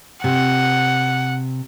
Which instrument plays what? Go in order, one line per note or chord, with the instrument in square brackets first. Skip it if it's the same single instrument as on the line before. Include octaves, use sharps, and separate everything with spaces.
[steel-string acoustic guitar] C3 [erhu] F#5